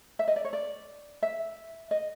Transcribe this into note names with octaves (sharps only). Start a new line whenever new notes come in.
E5
D#5
D5
C#5
D5
E5
D#5